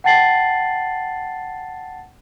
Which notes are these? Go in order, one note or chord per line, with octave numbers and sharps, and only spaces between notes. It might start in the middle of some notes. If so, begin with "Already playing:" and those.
F#5 G5 A5 A6 C7 F#7